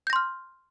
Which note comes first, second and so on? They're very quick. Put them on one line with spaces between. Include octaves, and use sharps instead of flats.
G6 A#6 C6 F6